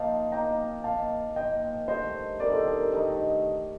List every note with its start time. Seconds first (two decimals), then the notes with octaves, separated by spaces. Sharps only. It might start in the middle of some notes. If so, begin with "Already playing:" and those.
Already playing: F3 A#3 D#4 F5 A5
0.32 F3 A#3 D#4 G5 A#5
0.84 F3 A#3 D#4 F5 A5
1.36 F3 A#3 D#4 D#5 G5
1.88 G2 D#3 A3 D#4 C5 D#5
2.40 G2 D#3 A3 D#4 A#4 D5
2.53 A4 C5
2.66 A4
2.79 A#4
2.92 G2 D#3 A3 D#4